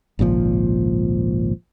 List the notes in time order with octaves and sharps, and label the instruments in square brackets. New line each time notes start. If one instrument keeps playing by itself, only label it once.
[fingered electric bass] G#1 C#2 A#2 F3